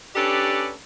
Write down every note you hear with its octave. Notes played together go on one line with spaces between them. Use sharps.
C#4 D4 G4 A4 B4 D5